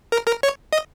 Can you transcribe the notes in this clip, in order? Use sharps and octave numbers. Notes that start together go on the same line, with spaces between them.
A#4
A#4
C#5
D#5